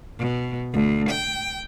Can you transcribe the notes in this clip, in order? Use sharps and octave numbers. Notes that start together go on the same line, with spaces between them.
B2
D2
G5